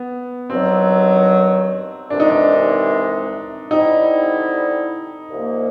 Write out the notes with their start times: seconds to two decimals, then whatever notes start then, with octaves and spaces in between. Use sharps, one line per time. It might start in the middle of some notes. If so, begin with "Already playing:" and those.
Already playing: B3
0.50 G2 D#3 F#3 C4
2.10 C2 C3 E3 G#3 C4 D4
2.20 D#4
2.30 D4
3.70 D3 G3 C4 D#4 E4 G4
5.30 C2 C3 F3 A#3